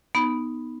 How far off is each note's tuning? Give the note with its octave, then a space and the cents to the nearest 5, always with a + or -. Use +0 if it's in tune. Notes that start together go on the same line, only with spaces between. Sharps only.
B3 +0 D#4 +0 B5 +0